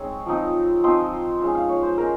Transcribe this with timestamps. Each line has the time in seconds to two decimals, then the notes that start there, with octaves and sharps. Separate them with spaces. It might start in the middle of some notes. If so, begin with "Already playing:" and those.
Already playing: G#3 C4 D#4 C#5
0.26 F3 C4 D#4
0.83 F3 C4 D#4 C6
1.40 G#3 C#4 F4
1.55 F5
1.69 C#5
1.83 C5
1.97 G#3 C#4 A#4